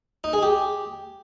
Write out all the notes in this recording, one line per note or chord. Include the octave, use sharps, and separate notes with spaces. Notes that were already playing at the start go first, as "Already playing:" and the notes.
D#4
G#4
G4